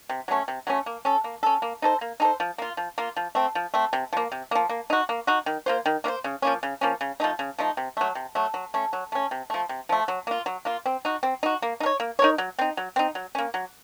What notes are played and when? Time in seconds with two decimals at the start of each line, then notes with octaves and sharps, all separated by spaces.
0.09 C3
0.28 F#3 A3 C#4
0.48 C3
0.67 F#3 A3 C#4
0.86 A#3
1.05 C#4 A4
1.24 A#3
1.43 C#4 A4
1.62 A#3
1.82 D#4 A4 C5
2.01 A#3
2.20 D#4 A4 C5
2.40 F3
2.58 A#3 F4
2.77 F3
2.98 A#3 F4
3.16 F3
3.35 A3 C4
3.55 F3
3.74 A3 C4
3.93 C3
4.13 F3 A#3
4.32 C3
4.51 F3 A#3
4.69 A#3
4.90 D#4 F#4
5.09 A#3
5.27 D#4 F#4
5.46 D#3
5.66 A#3 F4 C5
5.86 D#3
6.04 A#3 F4
6.08 C5
6.24 C#3
6.42 F3 A#3 C#4
6.63 C#3
6.81 F3 A#3 C#4
7.01 C#3
7.20 F3 A3 D#4
7.39 C#3
7.58 F3 A3 D#4
7.77 C3
7.97 F#3 A3
8.15 C3
8.35 F#3 A3
8.54 F#3
8.74 A3 C#4
8.93 F#3
9.12 A3 C#4
9.31 C3
9.50 F3 A3
9.69 C3
9.89 F3 A3
10.08 F#3
10.27 A#3 F4
10.46 F#3
10.65 A#3 F4
10.86 C4
11.05 D#4 F#4
11.23 C4
11.43 D#4 F#4
11.62 A#3
11.80 D#4 A#4
11.86 C#5
12.00 A#3
12.19 D#4 A#4 C#5
12.38 F#3
12.59 C4 D#4
12.77 F#3
12.96 C4 D#4
13.15 F#3
13.35 A#3 C#4
13.54 F#3